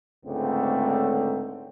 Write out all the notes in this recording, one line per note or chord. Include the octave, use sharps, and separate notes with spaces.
C#2 G#2 D3 A3 C4